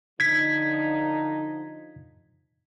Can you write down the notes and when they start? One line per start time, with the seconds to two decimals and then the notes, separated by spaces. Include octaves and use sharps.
0.20 D3 F3 D#4 G#6 B6